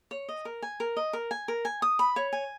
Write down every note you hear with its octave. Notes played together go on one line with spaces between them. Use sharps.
C#5
D#5
A#4
G#5
A#4
D#5
A#4
G#5
A#4
G#5
D#6
B5
C#5
G#5